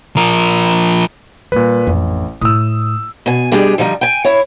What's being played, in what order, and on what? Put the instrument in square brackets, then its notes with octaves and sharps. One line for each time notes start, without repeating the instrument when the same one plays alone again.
[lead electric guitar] F3 A#4
[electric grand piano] A#2 B4 [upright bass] D#3 G3
[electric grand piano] A1 [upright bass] F2
[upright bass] A2 [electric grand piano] D#6 E6
[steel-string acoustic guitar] B2 G#5
B2 G3 D4 G4 G#4
D3 F3 G3 D#4
G5 G#5
E4 C#5